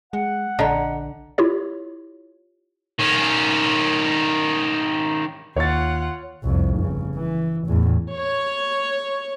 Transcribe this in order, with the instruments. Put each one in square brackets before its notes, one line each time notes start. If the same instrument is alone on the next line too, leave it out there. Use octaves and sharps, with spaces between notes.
[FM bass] G#3 [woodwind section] F#5
[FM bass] A#1 [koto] D3 [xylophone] D#5 A#5
[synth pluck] E4 F4 G4 C#5
[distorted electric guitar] D#3 C#4
[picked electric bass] D#2 [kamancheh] F4 F#5 [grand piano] C#5 C#6 A6
[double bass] C2 F2
G1 C#3
E3
E2 A2
[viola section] C#5